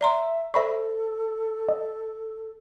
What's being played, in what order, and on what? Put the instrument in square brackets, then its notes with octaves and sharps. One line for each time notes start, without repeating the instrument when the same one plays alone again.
[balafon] D5 A#5 C6 [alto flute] E5
[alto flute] A4 [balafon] C5 D5 [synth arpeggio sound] E5 B5 C#6
[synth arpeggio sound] D#5